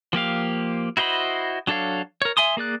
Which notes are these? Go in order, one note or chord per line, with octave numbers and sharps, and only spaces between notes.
F3 A#3 G4 F5
E4 F#4 C5 D#5 B5
F#3 D4 A4 C#5 F5
A#4 C#5
E5 G#5 C6 D#6
A#3 G#4 D5 F#6